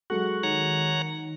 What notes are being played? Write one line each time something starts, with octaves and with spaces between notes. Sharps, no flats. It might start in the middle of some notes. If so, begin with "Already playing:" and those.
F#3 G#3 F#4 A4 F#5
D#3 C#5 F#5 A#5